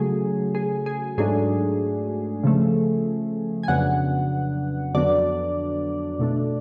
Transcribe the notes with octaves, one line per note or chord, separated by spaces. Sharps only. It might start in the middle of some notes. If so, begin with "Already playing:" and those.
Already playing: C#3 F#3 A3 G#4
G#4
G#4
G#2 F#3 A3 D4 G#4
C#3 F3 A3
G#5
F2 C#3 F#3 B3 D4 F#5
F2 D3 F#3 B3 D4 D5
B2 A3 D4